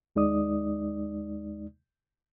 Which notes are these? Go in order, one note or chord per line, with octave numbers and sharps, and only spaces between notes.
D#2 G#3 D#4 D5 D#6